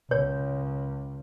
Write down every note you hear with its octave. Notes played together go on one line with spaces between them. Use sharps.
C#2 C#5